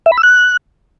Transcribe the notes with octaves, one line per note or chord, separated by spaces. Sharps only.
E5
B5
E6
F#6